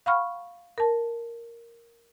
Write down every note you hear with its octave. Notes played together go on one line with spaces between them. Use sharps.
F5 F#5 B5 C#6 F6
A#4 A5